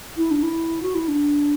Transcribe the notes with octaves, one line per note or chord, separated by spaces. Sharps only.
E4
D4
E4
F#4
E4
D4